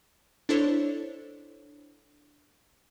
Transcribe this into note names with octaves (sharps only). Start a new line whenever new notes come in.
D4 E4 A4 C5 C#5